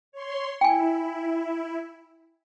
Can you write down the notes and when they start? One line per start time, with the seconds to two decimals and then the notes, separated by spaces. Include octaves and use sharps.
0.12 C#5 C6
0.61 E4 G5 G#5